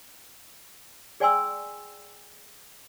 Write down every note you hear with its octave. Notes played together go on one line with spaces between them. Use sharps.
G#4 D5 G5 G#5 C6 E6